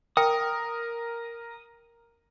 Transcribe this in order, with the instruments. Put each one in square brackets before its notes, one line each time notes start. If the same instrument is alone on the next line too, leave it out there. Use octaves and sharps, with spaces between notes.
[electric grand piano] A#4 [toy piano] G5 [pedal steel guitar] D#6